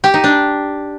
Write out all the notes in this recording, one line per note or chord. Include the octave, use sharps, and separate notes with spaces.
G4
D#4
D4